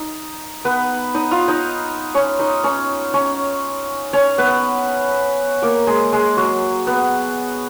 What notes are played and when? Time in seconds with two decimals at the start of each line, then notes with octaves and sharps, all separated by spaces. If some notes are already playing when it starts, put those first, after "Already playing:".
Already playing: D#4
0.65 B3 B4
1.15 D#4 D#5
1.31 F4 F5
1.48 D#4 D#5
2.15 C#4 C#5
2.39 D#4 D#5
2.64 C#4 C#5
3.14 C#4 C#5
4.13 C#4 C#5
4.38 B3 B4
5.62 A#3 A#4
5.87 G#3 G#4
6.12 G#3 G#4
6.37 F#3 F#4
6.87 B3